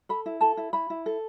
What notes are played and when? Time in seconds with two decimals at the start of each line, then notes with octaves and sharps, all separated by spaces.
0.09 A4 B5
0.26 E4
0.41 A4 A5
0.57 E4
0.73 E4 B5
0.90 E4
1.06 A4